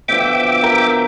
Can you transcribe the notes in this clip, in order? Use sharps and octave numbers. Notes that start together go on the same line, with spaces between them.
B2 D3 F3 E5 G5 D6
A#4